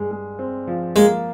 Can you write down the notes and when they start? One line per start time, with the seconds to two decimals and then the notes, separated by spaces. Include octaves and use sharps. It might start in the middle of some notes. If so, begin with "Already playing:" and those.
Already playing: G2 G#3
0.11 G#3
0.39 C4
0.67 F3
0.95 G#3 A#3